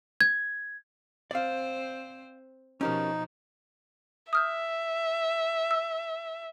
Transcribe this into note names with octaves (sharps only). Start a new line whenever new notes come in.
G#6
C4 C5 D5 F5
B2 F3 C#4 D#4 G4 A#4
E5 D#6 F6 G6
E6